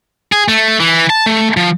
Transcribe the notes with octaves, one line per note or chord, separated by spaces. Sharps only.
G#4
A3
E3
A5
A3
F3